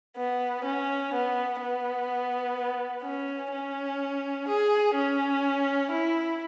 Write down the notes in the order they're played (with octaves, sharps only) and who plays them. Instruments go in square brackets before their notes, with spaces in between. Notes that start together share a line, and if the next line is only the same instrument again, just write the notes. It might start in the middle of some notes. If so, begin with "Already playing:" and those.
[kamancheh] B3
C#4
B3
B3
C#4
C#4
G#4
C#4
E4